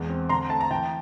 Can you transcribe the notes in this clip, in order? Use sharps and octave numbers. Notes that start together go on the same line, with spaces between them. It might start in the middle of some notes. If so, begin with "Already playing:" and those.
Already playing: E2 G#3
C4
D3 A#5 C6
A3 A5
A#5
E3 G5 A5